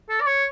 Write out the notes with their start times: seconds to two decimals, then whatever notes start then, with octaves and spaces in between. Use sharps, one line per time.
0.09 A4
0.21 D5
0.27 C#5